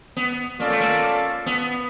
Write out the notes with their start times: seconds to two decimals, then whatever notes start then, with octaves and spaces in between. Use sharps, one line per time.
0.17 B3
0.60 A#3 C#4 F4 A4 D5
0.70 A3
0.80 A#3
1.46 B3